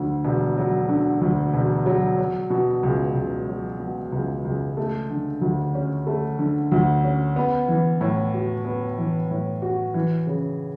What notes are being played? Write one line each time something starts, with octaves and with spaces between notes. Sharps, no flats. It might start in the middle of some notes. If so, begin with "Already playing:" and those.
Already playing: D2 D3
E1
F#3
D3
D2
E1
F#3
F#3
B2
C#2
C#2
F#3
B2
C#2
C#2
A3
D3
D2
C#4
A3
D3
D2
C#4
B3
E3
A2
F#4
B3
E3
A2
F#4
E3
C#3